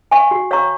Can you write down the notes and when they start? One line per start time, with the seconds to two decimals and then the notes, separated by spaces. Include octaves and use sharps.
0.11 F5 G#5 C#6
0.31 F#4
0.51 C#5 F5 A#5 C#6